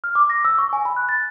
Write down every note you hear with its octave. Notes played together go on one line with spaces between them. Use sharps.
F6
D6
A#6
E6
C#6
G#5
B5
F#6
A6